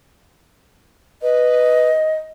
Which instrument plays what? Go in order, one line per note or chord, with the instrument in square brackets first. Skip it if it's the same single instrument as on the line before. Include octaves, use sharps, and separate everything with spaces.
[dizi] B4 [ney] D#5